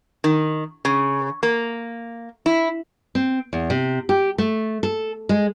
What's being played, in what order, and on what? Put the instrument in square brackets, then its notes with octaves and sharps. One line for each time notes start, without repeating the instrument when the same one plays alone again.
[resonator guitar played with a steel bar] D#3
C#3
A#3
E4
[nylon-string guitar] C4
E2
C3
G4
A3
A4
G#3